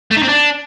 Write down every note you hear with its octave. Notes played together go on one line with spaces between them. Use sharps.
A3
D#4
C4
D4